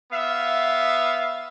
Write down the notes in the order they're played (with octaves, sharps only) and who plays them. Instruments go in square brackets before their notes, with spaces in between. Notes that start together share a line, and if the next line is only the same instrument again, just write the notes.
[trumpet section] B3 E5 F5